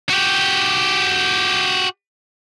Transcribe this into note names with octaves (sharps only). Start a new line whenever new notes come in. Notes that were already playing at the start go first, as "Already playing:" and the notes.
F#4 G4